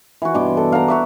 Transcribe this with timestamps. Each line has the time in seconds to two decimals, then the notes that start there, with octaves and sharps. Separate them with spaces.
0.22 E3 F#4
0.34 G2 B2 C6 D6
0.57 A4
0.72 F5 F#5 A#5 D6
0.88 F#4 E5 D6